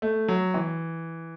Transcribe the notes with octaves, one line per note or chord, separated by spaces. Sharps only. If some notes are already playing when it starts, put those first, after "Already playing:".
A3
F#3
E3